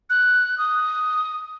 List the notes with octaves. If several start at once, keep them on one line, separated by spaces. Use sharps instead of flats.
F#6
D#6